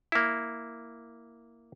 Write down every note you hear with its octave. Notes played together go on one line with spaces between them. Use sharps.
A#3 E4